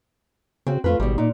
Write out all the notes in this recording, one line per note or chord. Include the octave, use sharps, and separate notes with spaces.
C#3 C4 F#4
F2 A3 F4 B4
G#1 B2 G3
A#2 D#4